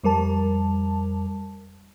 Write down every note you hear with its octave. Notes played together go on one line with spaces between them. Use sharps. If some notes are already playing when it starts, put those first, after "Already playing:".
F2 G3 A#4 A5